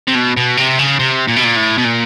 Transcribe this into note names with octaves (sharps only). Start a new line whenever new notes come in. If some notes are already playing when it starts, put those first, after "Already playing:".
C3
B2
B2
C3
C#3
C3
A#2
B2
A#2
A2
B2
A#2